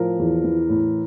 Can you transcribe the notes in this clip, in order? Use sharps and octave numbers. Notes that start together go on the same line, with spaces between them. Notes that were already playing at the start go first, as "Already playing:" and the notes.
Already playing: A2 F3 A#4
E2
E3
A2